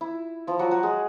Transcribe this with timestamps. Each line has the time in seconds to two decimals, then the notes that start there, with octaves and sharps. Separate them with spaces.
0.01 E4
0.47 F3 F4
0.59 F#3 F#4
0.71 F#3 F#4
0.83 G#3 G#4